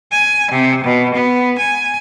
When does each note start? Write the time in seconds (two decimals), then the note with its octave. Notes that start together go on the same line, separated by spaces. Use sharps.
0.11 G#5
0.51 C3
0.82 B2
1.15 B3
1.58 G#5